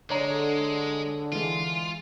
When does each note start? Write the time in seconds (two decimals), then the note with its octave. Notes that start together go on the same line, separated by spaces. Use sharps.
0.10 D3 G#3 C#5 D5 A#5
1.32 E3 G#3 F4